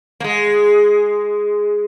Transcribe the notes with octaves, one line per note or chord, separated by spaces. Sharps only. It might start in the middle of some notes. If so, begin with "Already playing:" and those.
A#3
G#3